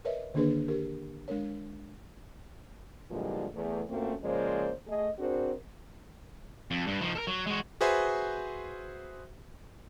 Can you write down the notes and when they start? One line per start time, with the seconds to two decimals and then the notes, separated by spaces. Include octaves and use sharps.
0.05 A#4 B4 C#5 D#5 E5
0.34 D3 D#3 A#3 D4 G#4 B4
0.68 G4 A#4
1.28 G#3 D4 A#4 C#5
3.10 A#2 D3 E3 F3 G3 G#3
3.54 E2 A3
3.89 A#2 A3 A#3 C4 C#4 F#4
4.23 C#3 F3 G#3 A#3 C5 D5
4.88 A3 G#4 D#5
5.19 C4 D4 F#4 G#4 A#4 C5
6.71 F2
6.87 G2
7.01 F3 D#4
7.15 A4 A#4
7.27 F#3
7.47 G#3 F#4
7.81 F#4 G#4 B4 C5 E5 G#5